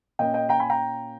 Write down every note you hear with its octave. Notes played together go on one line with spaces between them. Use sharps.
A#2 A#3 C#4 D#5 G5
D#5 G5
G5 A#5
G#5 B5
G5 A#5